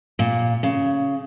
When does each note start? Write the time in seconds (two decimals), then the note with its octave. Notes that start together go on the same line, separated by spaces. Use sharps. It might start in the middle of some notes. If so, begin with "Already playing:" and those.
0.19 A#2
0.63 C#3